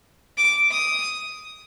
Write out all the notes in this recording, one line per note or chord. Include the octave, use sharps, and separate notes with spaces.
D6
D#6